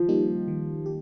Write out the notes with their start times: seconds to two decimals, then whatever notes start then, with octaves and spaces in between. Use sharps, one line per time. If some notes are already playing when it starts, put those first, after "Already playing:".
Already playing: D#3 F3
0.09 G3 A#3 D#4 G4
0.48 D#3
0.86 G4